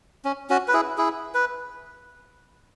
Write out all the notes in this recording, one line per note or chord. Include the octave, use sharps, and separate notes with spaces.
C#4
C#4 F#4
B4
E4 G#4
E4 G#4
B4